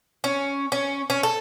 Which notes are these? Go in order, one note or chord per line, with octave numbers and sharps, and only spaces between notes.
C#4
C#4
C#4
A4